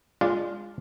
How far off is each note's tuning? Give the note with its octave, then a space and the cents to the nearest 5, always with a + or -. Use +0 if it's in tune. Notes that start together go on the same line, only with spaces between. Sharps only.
G#3 -25 D4 +0 F4 +0